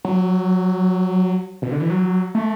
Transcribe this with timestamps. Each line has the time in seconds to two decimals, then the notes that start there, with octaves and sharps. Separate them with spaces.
0.05 F#3
1.62 B2
1.72 D3
1.80 E3
1.90 F#3
2.35 A3